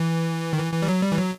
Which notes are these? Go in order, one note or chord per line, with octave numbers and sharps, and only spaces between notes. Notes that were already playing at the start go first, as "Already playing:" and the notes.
Already playing: E3
D#3
E3
E3
G3
F#3
G3
E3
F#3